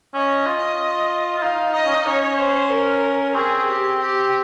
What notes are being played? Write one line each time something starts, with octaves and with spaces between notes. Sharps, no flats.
C#4 D#5
F4
F4
D#4 F5
D#4 D#5
C#4
D#4
C#4 C#5
C5
A#4
C4 G#4
G4
G4